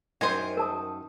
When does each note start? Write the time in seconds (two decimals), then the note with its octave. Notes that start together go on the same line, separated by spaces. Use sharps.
0.21 F#2 D#3 C5 G#5
0.57 A#4 A5 D#6